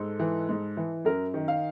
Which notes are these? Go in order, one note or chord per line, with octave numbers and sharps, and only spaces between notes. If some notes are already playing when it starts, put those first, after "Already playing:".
Already playing: G#2 A4
E3
G#2
E3
F#2 A#4
D#3
F5